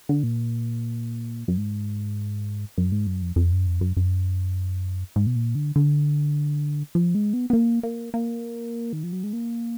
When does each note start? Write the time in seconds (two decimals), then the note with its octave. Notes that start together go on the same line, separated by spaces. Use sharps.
0.09 D3
0.23 A#2
1.48 F#2
1.58 G#2
2.78 F#2
2.92 G#2
3.07 F#2
3.22 F2
3.36 F2
3.52 F#2
3.67 F2
3.81 F#2
3.97 F#2
5.16 G#2
5.27 B2
5.36 A#2
5.55 D3
5.76 D3
6.95 F3
7.15 G#3
7.33 B3
7.50 B3
7.53 A#3
7.83 A#3
8.14 A#3
8.93 D#3
9.03 F3
9.13 F#3
9.23 G#3
9.33 A#3